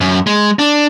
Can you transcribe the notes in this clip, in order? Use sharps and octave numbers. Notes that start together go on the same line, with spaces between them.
F#2
G#3
D4